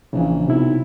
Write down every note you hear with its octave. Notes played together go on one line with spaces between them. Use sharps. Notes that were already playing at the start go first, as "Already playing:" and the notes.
A#1 C#3 E3
B1 C3 E4